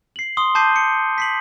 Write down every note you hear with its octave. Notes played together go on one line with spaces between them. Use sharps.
C7 F#7
C6 D#6 G7
A5 D6 G6 C7 D#7
C#7
B6 C7 F#7